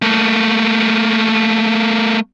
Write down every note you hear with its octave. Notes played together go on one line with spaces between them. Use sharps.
A3 A#3